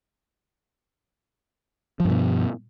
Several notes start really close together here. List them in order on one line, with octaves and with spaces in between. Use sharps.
F3 G2 B2